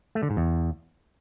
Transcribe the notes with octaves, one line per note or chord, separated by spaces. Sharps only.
A3
D3
G#2
E2